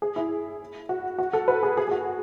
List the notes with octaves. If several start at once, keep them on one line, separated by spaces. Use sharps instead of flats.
G#4
E4
F#4
F#4
A4
B4
G#4
G#4
G#4
F#4